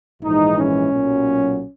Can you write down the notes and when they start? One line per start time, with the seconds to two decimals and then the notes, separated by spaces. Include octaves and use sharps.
0.21 A#1 G#2 E3 G#3 D#4
0.57 C#4
0.92 B1 A#2 F#3